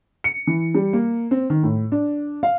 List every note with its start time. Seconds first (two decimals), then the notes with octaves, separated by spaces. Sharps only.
0.24 C#7
0.47 E3
0.75 G3
0.93 A#3
1.31 C4
1.50 D#3
1.63 A2
1.92 D4
2.43 F5